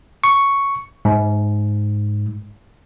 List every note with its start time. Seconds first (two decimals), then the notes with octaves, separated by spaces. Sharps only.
0.24 C#6
1.05 G#2